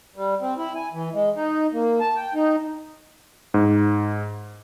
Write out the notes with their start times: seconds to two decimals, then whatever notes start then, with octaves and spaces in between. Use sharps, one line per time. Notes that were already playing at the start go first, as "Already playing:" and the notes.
0.16 G3
0.41 C4
0.57 E4
0.75 G#5
0.93 E3
1.13 G#3
1.36 D#4
1.73 A#3
2.00 A5
2.16 G5
2.34 D#4
3.54 G#2